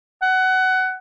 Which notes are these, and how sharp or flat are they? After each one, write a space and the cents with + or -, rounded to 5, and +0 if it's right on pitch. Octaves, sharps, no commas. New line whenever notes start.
F#5 +20